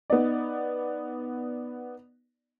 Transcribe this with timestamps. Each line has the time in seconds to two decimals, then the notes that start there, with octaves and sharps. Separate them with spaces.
0.10 B3 D#4 D5